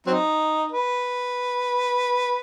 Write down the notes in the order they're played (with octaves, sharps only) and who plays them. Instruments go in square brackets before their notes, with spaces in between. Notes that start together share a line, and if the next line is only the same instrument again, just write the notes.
[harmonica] F#3 C4 D#4
B4